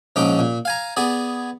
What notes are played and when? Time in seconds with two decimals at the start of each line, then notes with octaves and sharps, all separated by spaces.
0.16 A#1 G#2 C#4 D#4 D6
0.39 A#2
0.65 F5 G#5 A#5
0.97 B3 G#4 D5 G#5